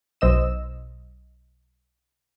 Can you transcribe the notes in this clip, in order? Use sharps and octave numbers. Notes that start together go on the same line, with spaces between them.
B1 C5 D#5 E6 E7